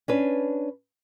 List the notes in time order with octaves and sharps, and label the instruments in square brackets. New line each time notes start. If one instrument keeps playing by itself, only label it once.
[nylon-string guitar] C#4 D4 B4